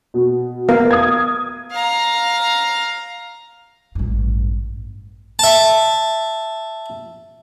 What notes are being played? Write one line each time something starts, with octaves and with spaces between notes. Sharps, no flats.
B2
B3 A#4 F5
D#6 G#6
F5 A#5
A1 G2
E5 A5